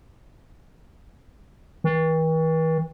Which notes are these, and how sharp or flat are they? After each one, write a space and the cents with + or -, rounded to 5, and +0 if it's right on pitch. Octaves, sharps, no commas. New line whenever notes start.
E3 -45